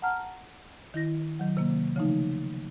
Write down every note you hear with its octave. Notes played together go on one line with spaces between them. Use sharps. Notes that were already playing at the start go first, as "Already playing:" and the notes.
F#5 A5 A#5 F6
D#3 E4 A#6
D#3 F#3
C3 D#3 A#3
C#3 F3 A3 D#4